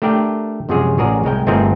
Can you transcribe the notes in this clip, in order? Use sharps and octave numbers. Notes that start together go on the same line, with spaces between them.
A3 D4 G4 A#4 D5 G5
F#2 C3 F3 G#3 G#4 C#5
A1 C#4 F#4 G#4 A#4 D5
C2 G#3 A#4 G5
G1 A3 C4 D#4 G#4 A#4